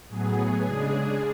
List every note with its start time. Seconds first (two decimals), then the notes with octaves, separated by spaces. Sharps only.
0.08 A2 F#3 B3 G#4
0.64 C#3 G#3 D4 G#4